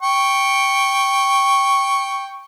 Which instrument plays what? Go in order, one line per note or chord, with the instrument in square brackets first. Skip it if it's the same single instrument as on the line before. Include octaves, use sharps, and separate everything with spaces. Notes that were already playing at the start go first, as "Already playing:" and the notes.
[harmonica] G5 C#6